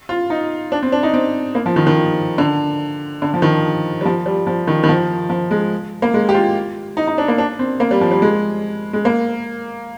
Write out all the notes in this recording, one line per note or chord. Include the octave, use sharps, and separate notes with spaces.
F4
D#4
D4
C4
D4
D#4
C4
A#3
F3
D#3
D#3
D3
D3
F3
D#3
G3
F3
G3
F3
D#3
D#3
F3
F3
G#3
A#3
G#3
G4
F4
D#4
D#4
D4
A#3
D4
C4
A#3
G3
F3
G3
G#3
G#3
A#3